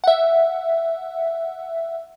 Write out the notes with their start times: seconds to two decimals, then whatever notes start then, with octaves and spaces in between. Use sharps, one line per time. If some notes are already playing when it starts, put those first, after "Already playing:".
0.04 E5 F#5